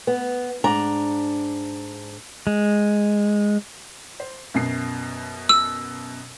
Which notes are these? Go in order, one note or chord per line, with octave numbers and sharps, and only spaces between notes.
B3
G#2 D4 A#5
G#3
C5
F#2 B2 C7
E6